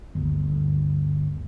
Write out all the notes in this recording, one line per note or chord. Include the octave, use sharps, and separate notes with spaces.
G1 D2